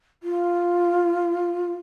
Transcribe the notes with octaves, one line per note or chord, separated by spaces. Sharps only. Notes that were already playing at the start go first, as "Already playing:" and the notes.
F4